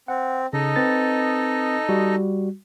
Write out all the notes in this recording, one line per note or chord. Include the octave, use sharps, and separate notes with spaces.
C4 F#5
C#3 D#4 A4 D#5
C4 B4 A6
G3 F#4